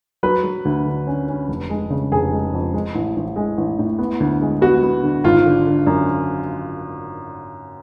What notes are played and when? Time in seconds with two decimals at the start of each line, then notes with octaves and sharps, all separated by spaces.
0.23 F#3 B4
0.44 F#3
0.65 D2
0.86 D3
1.07 C#4
1.28 C#4
1.48 F1
1.70 G#3
1.90 C#3
2.12 F1 G#4
2.32 G#3
2.54 F2
2.74 G#3
2.95 A1
3.16 A1
3.36 G#3
3.57 A1
3.79 A2
3.99 B3
4.20 D2
4.41 G#3
4.61 B3 F#4
4.83 B3
5.03 D3
5.24 G#1 F4
5.46 D3
5.66 D3
5.87 F#2